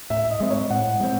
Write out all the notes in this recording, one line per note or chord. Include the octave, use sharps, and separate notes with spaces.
A2 E5
D#5
G#3 C4 D#5
C#5
A2 F#5
G#3 C4